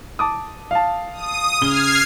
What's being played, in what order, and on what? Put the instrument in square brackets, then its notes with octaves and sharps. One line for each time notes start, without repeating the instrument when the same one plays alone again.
[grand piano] A5 D6 D#6
F5 A5
[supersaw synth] D#6
[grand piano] C#3 G7 [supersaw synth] F6 G#6 C7